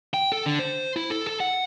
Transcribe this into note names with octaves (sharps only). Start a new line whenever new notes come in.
G5
A4
D3
C5
E4
A4
A4
F#5